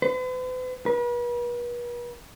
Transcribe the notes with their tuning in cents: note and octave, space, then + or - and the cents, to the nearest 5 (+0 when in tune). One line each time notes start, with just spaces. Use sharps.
B4 +45
B4 -40